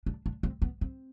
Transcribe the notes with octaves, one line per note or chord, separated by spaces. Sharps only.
D4
D4
C4
B3
C4